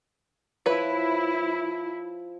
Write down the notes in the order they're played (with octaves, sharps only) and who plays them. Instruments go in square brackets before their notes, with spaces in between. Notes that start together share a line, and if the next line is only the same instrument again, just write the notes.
[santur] F3 [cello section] E4 [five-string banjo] B4 C#5